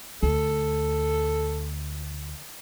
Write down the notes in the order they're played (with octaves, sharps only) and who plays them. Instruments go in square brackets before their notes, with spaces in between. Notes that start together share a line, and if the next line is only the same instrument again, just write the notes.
[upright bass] D2 [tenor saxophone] A4